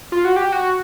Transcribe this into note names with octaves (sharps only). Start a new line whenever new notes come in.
F4
F#4
G4
F#4